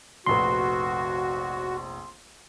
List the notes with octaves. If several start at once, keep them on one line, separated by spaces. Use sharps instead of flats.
F1 A#1 F#4 B4 C6